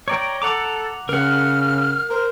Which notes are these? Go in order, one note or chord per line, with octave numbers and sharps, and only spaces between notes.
C#5 D5 G5 A#5
A4 F#5 A#5 D6
C#3 A#4 F#5 F6
A#4 C5